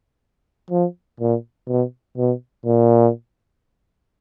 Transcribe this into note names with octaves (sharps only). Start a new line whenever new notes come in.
F3
A#2
B2
B2
A#2